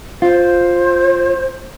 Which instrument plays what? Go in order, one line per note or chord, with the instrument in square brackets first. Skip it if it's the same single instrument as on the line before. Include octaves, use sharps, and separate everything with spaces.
[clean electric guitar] F4 [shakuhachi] C5